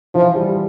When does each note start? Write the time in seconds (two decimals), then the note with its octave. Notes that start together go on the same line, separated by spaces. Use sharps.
0.15 E3 F3
0.35 G3